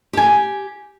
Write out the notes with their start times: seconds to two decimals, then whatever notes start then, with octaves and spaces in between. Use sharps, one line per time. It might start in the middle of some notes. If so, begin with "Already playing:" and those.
0.13 G4 G#5